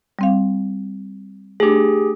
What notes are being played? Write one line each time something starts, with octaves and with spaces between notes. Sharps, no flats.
G3 C4 F5
A3 D4 G4 G#4